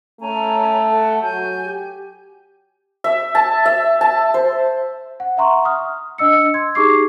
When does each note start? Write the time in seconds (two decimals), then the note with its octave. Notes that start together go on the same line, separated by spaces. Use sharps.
0.21 A3 C#4 G#5 A#5
0.90 A4 F#5
1.23 F#3 G#5 G6
1.65 G4
3.04 E5
3.35 A5
3.66 E5
4.01 A5
4.34 C5
5.20 F#5
5.37 E5 F#5 A#5 C6 C#6
5.65 D#6 F6
6.18 D4 D#5 E6 C#7
6.54 C6 G#6
6.75 D#4 G4 G#4 C#6 D6 C7